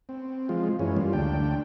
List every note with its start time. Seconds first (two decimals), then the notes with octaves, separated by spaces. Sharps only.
0.09 C4
0.49 F3 G#3 F4
0.79 F#2 E3 G#3 C#4
0.97 G3 A#3 F4
1.13 D2 D4 G5